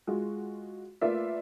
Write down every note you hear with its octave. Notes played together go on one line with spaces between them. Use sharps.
G#3 F4 F#4
A3 A#3 F4 B4 D5 E5